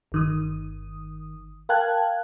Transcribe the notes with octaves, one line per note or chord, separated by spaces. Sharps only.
G1 D#3 D#6
A#4 F5 G5 A5 F#6 G#6